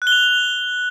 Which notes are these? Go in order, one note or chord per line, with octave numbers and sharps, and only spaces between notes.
F#6
G7
F7